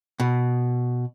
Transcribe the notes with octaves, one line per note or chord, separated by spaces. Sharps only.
B2